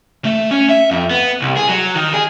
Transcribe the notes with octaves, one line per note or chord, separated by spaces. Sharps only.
A3
C#4
E5
F2
B3
C2
G#4
F#3
D#3
G#4